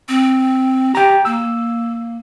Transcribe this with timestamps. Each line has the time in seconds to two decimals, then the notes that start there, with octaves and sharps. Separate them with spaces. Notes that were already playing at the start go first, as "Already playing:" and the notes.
0.09 C4
0.95 G4 G5 A#5
1.25 A#3 E6